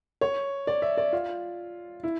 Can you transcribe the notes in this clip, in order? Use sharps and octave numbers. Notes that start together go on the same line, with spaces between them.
C#5
D5
E5
D5
F4
E4